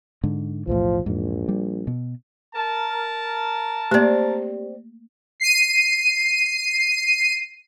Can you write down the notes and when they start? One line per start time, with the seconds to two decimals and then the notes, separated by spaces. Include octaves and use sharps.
0.24 G#2 D3
0.67 B1 E2 A2 F3
1.06 A#1 E2 G#2
1.49 G3
1.87 B2
2.55 A#4 A5
3.91 A3 A#3 C4 G4 D5
5.40 C7 D#7